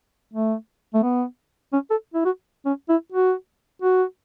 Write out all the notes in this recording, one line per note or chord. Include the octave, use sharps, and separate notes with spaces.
A3
A3
B3
C#4
A4
E4
F#4
C#4
E4
F#4
F#4